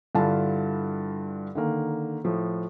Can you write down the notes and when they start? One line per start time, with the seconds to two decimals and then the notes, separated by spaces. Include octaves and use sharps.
0.15 G2 D3 E4 F4 A5
1.55 D3 D#3 A#3
2.24 A2 F3